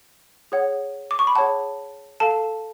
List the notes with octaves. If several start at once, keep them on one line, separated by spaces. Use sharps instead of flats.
G#4 C#5 F#5
D6
C#6
B5
G#4 C#5 F#5 A5
A4 F5 A5